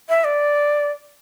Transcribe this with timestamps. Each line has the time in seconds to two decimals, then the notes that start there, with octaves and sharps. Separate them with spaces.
0.09 E5
0.24 D5